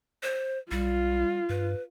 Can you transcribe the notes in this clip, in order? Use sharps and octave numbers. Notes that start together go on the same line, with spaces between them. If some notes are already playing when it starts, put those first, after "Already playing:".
C5
B1 G3 F4
G2 B4